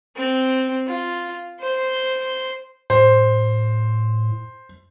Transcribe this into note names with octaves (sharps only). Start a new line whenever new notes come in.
C4
F4
C5 C6
A2 C5